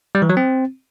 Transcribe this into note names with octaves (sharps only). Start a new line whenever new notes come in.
G3
E3
F#3
C4